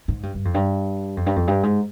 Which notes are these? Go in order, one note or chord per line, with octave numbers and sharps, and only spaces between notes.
G#2
G2
G2
F2
G2
F2
G2
F2
G2
G#2